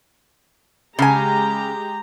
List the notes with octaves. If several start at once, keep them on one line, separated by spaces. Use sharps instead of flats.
C#3 G#3 G4 G#5 A#5